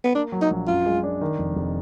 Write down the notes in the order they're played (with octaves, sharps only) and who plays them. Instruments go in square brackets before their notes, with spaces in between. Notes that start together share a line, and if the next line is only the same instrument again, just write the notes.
[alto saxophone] B3
[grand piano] A#3 [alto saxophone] D4
[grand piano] F#3
[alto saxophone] D#4
[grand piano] A#1
[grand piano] F#2 [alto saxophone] F4
[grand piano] G#3
D4
D#3
F1
F1